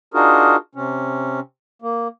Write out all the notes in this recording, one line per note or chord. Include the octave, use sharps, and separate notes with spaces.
D4 D#4 F4 F#4 G#4 A#4
C3 C#4
A#3